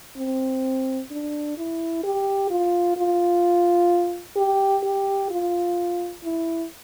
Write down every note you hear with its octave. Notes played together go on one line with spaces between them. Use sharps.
C4
D4
E4
G4
F4
F4
G4
G4
F4
E4